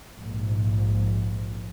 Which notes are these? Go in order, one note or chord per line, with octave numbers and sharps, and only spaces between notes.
A#1 G#2